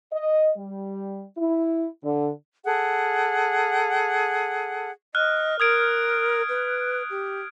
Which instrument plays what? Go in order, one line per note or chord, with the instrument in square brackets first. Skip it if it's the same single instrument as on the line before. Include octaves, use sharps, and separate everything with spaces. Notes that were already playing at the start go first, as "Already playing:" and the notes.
[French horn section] D#5
G3
E4
D3
[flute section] G#4 A4 F#5
[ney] D#5 [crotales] F6 F#6
[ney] A#4 [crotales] D#6 G#6 D7
[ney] B4
G4